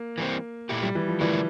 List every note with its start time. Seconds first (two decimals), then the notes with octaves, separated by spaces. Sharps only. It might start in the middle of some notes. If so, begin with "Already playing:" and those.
Already playing: A#3
0.18 E3 G3 C4
0.69 A#2 A3 E4 G4
0.83 G3
0.95 E3
1.08 F3
1.20 D3 E3 A3 E4 A#4 D5